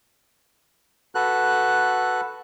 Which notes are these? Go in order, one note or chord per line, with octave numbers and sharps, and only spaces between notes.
F#4 A4 B4 F#6